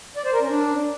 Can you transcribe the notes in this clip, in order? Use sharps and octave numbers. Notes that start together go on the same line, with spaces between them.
D5
C5
A#4
C#4
D4